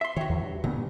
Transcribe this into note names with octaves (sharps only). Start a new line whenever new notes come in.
E5 C6
D#3 F#4 C#5
E2
G2
A#2 D3 B3
G2